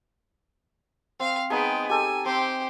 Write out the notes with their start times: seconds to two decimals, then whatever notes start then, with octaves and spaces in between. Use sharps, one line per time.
1.20 C4 F5
1.50 G#3 B3 D#4 G#4 G5
1.89 G4 A4 G#5
2.25 C4 G4 C5 G#5